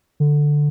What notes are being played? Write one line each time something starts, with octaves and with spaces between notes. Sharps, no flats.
D3